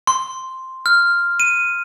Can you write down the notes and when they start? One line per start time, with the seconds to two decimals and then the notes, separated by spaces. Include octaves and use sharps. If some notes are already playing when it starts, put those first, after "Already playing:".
0.07 C6
0.86 F6
1.40 D#7